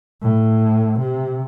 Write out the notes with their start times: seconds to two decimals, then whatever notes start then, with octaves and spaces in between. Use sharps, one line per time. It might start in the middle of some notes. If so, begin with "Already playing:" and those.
0.22 A2
0.99 C3